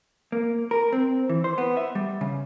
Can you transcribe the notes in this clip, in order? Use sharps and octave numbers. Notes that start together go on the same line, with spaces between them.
A#3
A#4
C4
E3
C5
B3
E5
G3
C#3